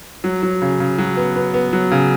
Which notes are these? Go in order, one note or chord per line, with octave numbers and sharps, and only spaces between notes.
F#3
F#3
C#3
C#3
F#3
B3
B3
B3
F#3
C#3